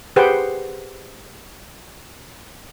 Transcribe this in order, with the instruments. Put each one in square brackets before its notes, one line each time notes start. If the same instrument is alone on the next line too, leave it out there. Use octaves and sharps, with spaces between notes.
[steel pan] G4 G#4 B4 C5 F#5 G5